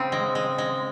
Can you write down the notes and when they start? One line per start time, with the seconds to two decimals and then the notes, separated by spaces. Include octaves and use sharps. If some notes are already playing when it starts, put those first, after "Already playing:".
Already playing: C#3 C4
0.12 G#3
0.35 G#3
0.58 G#3